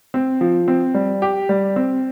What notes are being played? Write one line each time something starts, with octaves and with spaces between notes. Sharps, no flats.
C4
F3
C4
G3
G4
G3
C4